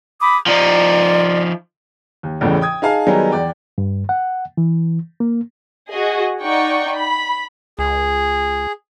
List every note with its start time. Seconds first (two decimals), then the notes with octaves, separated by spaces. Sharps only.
0.20 B5 D6 D#6
0.46 F3 D#4 D5
2.23 D#2
2.41 A1 E2 A2 C#3
2.61 G5 D#6 G#6
2.82 D#4 G#4 F5 A5
3.07 D#3 F#3 G3 B3 D#4 G#4
3.32 E2 D5 G5
3.78 G2
4.09 F#5
4.57 E3
5.20 A#3
5.90 F#4 G#4 D#5
6.41 D#4 D5 F#5 G5 C#6
6.95 B5
7.79 C#2 G#4